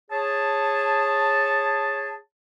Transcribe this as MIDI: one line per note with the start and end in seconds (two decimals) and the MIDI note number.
0.11 2.15 68
0.11 2.15 73
0.11 2.15 81